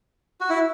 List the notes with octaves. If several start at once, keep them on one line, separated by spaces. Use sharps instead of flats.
F#4
E4